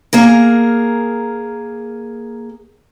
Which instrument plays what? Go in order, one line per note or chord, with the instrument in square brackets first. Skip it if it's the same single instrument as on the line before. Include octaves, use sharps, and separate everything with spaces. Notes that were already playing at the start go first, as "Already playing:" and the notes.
[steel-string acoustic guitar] A#3 G#4 A#4